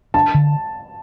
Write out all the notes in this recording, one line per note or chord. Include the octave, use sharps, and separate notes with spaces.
D4 A5
D3